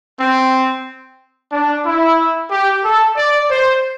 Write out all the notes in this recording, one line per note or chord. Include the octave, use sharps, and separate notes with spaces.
C4
D4
E4
G4
A4
D5
C5